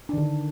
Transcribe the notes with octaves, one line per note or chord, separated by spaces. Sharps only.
D3 D#3 D4